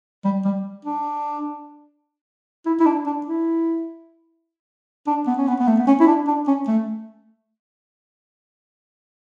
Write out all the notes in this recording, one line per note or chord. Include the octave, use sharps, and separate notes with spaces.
G3
G3
D4
E4
E4
D4
D4
E4
D4
B3
C#4
B3
B3
A3
B3
C#4
E4
D4
D4
C#4
A3